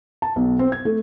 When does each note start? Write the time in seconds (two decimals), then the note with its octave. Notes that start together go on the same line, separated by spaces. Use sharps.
0.22 A5
0.36 B1
0.59 C4
0.72 G#6
0.85 A3